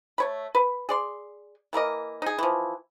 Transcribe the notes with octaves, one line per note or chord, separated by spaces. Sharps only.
A3 C#5 B5
B4
G#4 D5 C6
E3 A#3 A#4 D#5
D#4 G#4
E3 F3